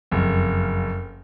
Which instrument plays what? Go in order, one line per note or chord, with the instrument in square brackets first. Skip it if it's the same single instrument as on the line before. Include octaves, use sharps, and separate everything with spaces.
[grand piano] F#1 F2